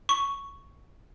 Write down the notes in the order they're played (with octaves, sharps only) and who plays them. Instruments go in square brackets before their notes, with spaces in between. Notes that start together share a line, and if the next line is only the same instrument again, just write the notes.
[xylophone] C#6